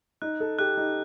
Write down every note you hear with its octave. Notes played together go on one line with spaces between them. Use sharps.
D#4 F#6
A4
G4 F#6
D#4